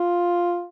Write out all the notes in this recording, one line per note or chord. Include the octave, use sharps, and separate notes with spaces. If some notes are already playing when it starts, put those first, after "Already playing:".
Already playing: F4